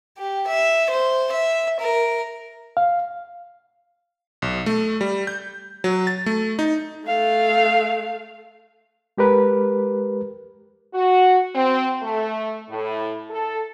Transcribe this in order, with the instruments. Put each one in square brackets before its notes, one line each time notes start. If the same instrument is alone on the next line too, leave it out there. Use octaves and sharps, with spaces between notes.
[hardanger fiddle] G4
E5
C5
E5
A#4
[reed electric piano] F5
[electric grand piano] B1
A3
G3
G6
F#3
A6
A3
D#4
[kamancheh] A3 F5
[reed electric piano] G#3 G4 A#4 B4
[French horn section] F#4
C4
A3
A2
A4